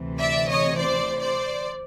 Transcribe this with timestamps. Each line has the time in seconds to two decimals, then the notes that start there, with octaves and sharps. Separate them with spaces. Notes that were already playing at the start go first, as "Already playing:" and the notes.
Already playing: D2 C3 E3
0.18 D5 E5
0.48 C#5 D#5
0.77 C5 D5
1.20 C5 D5